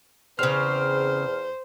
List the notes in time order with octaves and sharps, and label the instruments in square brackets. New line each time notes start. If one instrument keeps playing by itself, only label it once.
[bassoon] E2 [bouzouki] C#3 C4 [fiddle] C5 [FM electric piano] F6